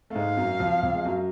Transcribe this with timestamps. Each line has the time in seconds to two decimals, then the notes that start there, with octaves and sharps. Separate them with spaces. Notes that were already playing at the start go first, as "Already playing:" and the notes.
0.10 A3
0.15 G#2 G#3 F5
0.37 F#2 F#3
0.60 F2 F3
0.83 F2 F3
0.95 G#3
1.05 F#2 F#3